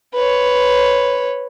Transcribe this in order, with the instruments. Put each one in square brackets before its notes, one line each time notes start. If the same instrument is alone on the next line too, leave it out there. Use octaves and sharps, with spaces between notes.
[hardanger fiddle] B4 C#5